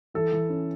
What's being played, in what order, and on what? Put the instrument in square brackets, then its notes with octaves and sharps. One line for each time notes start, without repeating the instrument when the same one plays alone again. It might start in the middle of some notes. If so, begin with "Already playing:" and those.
[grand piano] E3 A4
E3
C#4